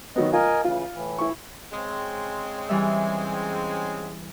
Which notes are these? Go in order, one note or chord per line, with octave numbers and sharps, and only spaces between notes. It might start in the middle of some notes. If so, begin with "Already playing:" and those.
D#3 F#3 B3 D#5
F4 A#4 D#5 G#5
C#3 E3 F4
A2 E3
E4 C#6
C#3 G#3 C4
E3 G3 E5